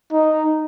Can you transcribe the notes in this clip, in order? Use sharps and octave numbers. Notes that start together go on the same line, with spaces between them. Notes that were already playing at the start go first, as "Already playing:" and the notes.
D#4